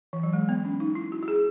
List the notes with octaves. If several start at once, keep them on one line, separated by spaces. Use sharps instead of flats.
E3
F#3
G#3
B3
C#4
D#4
E4
F#4
F#4
G#4